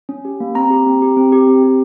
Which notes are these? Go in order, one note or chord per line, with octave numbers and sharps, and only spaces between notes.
C#4
G4
A#3
C4 A#5
G4
C4
G4
C4
G4
C4
G4